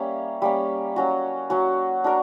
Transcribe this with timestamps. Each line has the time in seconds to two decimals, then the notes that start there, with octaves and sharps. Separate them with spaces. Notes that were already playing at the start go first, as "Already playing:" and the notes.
Already playing: G3 A#3 C#4 C#5 E5
0.42 G3 A#3 C#4
0.96 F#3 C#4 F#4
1.50 F#3 C#4 F#4
2.04 D4 F#4 A#4